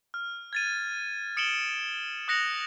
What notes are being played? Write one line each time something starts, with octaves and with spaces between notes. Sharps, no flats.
F6
G#6 A6 D#7
D#6 C#7 D7 E7 F#7 G7
D#6 F#6 A#6 C#7 F7 F#7